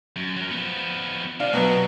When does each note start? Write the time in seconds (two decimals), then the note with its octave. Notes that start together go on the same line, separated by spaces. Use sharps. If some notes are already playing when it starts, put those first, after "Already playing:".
0.16 F#2
0.37 F#3 A#4
0.51 F3 B3
1.40 C3 D4 F5
1.53 B2 F#3 B3